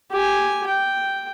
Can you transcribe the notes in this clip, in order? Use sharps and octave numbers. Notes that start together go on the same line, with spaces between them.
G4 G#5
G5